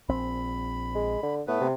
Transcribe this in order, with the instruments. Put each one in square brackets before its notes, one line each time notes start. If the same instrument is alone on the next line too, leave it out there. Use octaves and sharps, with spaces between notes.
[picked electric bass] A#1 C4 [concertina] B5
[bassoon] G#3
D3
[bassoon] A2 [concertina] A3 B3 B4
[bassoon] C3